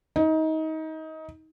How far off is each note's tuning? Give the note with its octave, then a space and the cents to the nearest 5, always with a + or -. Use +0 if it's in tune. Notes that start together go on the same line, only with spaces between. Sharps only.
D#4 +25